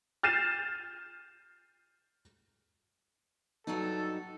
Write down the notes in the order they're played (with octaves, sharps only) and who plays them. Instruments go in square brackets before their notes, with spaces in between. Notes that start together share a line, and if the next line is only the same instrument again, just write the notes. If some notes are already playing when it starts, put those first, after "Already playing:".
[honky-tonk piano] F6 G6 A6 C7 D#7 E7
[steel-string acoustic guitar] G2 F#3 D#4 [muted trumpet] A4